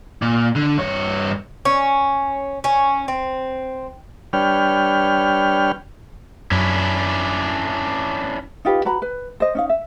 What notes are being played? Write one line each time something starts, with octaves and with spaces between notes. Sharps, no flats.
A#2
D3
G2 C#5
C#4
C#4
C4
G3 D4 B4 C#5 G5 F6
F#2 C#4 D4 E4
D#4 F4 G4 B4
F#4 B4 A#5 B5
B4
C5 D#5
C#4 D#4 F5
E5